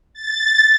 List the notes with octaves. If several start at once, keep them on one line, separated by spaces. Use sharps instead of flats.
A6